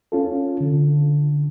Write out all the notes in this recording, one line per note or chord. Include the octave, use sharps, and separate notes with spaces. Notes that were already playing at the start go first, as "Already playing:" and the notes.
C#4 F4 A4
D3